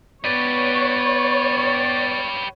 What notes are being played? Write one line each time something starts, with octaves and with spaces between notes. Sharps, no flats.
B3 G4 B4 C#5 D5